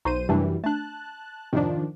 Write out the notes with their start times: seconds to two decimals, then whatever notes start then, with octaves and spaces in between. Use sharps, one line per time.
0.05 B1 D#4 F#4 C5 D#7
0.29 F#2 C3 E3 G3 A3 D4
0.64 A3 D4 A5 F#6
1.53 F2 G#2 C3 D#3 F3 D4